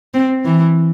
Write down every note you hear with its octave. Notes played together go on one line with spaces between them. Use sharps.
C4
E3